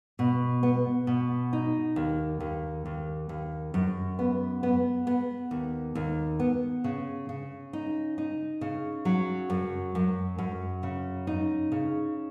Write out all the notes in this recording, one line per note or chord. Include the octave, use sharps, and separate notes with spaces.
B2
B3
B2
D#4
D#2
D#2
D#2
D#2
F#2
B3
B3
B3
D#2
D#2
B3
C#3
C#3
D#4
D#4
C#3
F#3
F#2
F#2
F#2
C#3
D#4
C#3